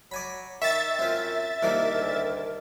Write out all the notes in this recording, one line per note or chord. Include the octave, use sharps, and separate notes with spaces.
F#3 D5 G#5 B5
D#3 E5 C#6 A6
F#2 C4 F4
C2 D#3 F3 A#3 A#4
D2